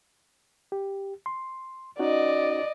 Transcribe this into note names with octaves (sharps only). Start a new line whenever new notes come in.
G4
C6
C#4 D#4 F#4 D5 D#5